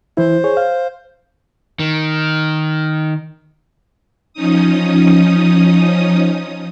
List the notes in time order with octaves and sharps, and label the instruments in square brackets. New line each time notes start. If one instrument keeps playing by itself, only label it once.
[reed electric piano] E3 E4 [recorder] C5
[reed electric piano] G#4 C#5
F5
[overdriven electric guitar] D#3
[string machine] F3 C#4 D#4 D#6